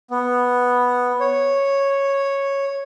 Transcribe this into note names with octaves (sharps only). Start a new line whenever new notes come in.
B3
C#5